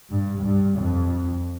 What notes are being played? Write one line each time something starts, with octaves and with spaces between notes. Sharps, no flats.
G2
G2
F2